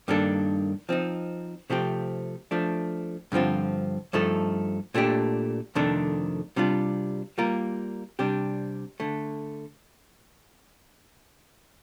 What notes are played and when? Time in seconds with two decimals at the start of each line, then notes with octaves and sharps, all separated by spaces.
0.08 G2 D#3 A#3 D4 A4
0.89 F3 C4 D#4
1.70 C3 F3 A3 C4 G4
2.51 F3 A3 D4
3.32 G2 D3 F3 C4 F4
4.13 G2 F3 A3 D#4 A4
4.94 A#2 A3 D4 G4
5.75 F2 C3 D#3 A3 D4
6.56 C3 G3 D4 F4
7.38 G3 A#3 F4 A#4
8.19 C3 G3 D4 G4
9.00 D3 A3